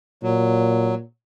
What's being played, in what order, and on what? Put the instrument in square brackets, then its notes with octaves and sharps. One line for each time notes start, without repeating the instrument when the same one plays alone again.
[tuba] A#2 [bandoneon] F#3